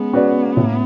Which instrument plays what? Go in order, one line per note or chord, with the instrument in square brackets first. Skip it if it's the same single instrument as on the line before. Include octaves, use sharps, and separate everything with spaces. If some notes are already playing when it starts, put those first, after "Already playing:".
Already playing: [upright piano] G#3 C#4 [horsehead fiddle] B3
[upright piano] C#4 F#4 B4 D5
A2